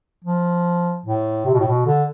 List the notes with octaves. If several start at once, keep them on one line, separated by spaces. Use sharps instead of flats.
F3
A2
C3
B2
A2
B2
D3